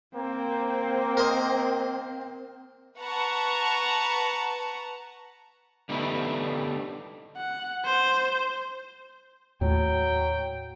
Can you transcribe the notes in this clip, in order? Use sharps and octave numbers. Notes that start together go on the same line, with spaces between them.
A#3 C4
A#4 C5 D#5
B4 F#5 A5 A#5 C#6
D3 G3 A3 B3 D#4 E4
F#5
C5
D#2 A2 F#3 G5